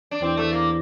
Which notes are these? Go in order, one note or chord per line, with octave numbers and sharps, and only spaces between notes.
D4
E2 C4
A3
A#3